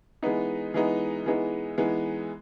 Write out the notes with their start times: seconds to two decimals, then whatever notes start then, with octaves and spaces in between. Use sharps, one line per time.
0.22 E3 G#3 B3 D#4
0.74 E3 G#3 B3 D#4
1.26 E3 G#3 B3 D#4
1.78 E3 G#3 B3 D#4